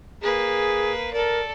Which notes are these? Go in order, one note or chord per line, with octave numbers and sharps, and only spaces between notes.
A#3 G#4 B4
A4 A#4 D5